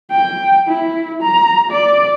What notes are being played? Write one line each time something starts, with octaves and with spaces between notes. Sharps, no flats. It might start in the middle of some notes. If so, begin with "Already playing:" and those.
G5
E4
A#5
D5